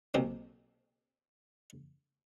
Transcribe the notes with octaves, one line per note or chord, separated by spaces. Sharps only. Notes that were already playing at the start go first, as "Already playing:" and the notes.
B1 C3 A#3